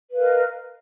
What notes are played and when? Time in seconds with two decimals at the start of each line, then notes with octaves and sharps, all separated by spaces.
0.10 B4
0.13 F5
0.17 A#4
0.20 D#5